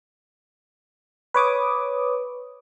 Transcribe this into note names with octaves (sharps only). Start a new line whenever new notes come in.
B4 C#5 D6 D#6